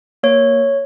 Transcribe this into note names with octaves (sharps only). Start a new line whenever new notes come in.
A#3 C#5